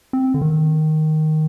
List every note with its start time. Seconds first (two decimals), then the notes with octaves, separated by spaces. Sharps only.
0.13 C4
0.34 D3
0.41 D#3